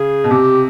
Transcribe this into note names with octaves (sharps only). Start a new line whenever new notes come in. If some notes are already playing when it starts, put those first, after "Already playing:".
Already playing: C#3 G#4
B2
C3 G4